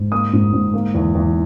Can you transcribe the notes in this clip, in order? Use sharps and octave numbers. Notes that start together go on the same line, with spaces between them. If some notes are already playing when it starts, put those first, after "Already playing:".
Already playing: G#2
A#3 D#6
G#2
G#2
A#3
E2
E2